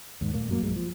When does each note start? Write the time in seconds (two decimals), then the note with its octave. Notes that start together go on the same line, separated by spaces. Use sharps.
0.21 D#2 G#2
0.34 A#2 A3 A#3
0.49 F#2 F#3 A#3
0.62 B1 G2 F#3 G#3
0.76 F3